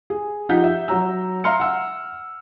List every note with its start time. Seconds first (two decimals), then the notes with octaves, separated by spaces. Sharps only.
0.10 G#4
0.49 F3 D#4 G4 F#5 G6 B6
0.64 E5
0.88 F#3 F#4 C#5 A#5 E6
1.44 E5 F5 A#5 C6 F6 C#7
1.60 F#5 E6